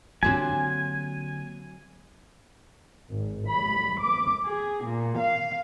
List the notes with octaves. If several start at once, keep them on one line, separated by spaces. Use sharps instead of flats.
D3 F#3 A#3 C4 G4 G#5
G#1
B5
D6
G#4
A#2
F5